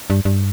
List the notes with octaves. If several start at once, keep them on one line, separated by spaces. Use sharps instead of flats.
G2
G2